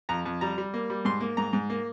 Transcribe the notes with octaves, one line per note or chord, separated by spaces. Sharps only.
F2 A#5
F2
G3 A#5
G3
A#3
G3
G#2 C6
A#3
G#2 A#5
G#2
A#3